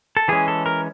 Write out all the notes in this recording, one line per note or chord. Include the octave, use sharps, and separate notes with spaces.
A4
E3 G#3 C#4 G#4
A4
A#4